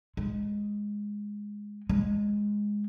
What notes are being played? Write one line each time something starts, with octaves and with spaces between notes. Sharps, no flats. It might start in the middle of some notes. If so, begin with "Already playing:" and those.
G#3
G#3